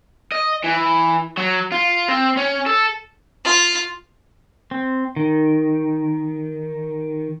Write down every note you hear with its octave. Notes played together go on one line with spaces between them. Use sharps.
D#5
E3
F#3
F4
C4
C#4
A4
F4
C4
D#3